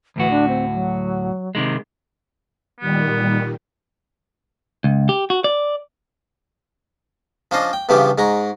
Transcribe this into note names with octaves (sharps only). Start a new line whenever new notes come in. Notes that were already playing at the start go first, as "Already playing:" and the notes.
D2 A2 E3 F#4
D4
C4
F#3
C3 D#3 G#3
A#2 D#3 G3 B3
C#2
G4
F#4
D5
F3 C#4 D4 C5 D#5
G5
G2 C#3 E3 F3 B3 G4
G#2 G#3 A#5 C#6